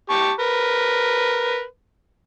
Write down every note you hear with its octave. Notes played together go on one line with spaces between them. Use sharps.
G4 A5 C#6
A#4 B4